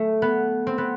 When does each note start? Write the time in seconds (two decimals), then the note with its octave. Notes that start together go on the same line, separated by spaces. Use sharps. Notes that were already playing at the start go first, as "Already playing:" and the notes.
Already playing: A3
0.22 B3
0.67 C4
0.78 B3